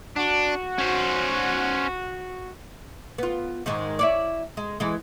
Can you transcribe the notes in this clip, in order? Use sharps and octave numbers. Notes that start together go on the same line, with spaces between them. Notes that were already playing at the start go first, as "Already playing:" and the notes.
D4 F#4
C#4 C5
B3 F4
G#2 D#3 G#3
E4 C#5 D5
G#3
E3 G#3